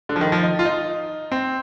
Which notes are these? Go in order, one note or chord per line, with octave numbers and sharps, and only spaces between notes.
D3
F3
D#3
F3
D#4
F4
D#4
C4